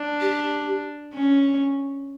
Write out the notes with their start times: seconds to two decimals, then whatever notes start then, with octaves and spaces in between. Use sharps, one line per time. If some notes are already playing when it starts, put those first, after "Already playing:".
Already playing: D4
0.21 G4
1.14 C#4